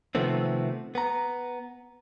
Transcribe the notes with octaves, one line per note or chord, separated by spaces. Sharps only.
C3 D#3 F3 A3 B3 C4
B3 A#5